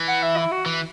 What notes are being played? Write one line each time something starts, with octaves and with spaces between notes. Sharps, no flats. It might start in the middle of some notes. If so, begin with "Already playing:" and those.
Already playing: E3
F#5
E5
E4
F#4
E3